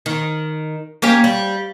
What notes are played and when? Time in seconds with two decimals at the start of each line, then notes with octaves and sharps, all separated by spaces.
0.06 D#3
1.02 A#3 C#4 G4
1.24 G3